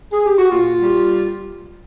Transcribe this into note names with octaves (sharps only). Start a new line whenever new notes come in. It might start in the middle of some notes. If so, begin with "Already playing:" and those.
G#4
G4
F#4
A#2 F4
G3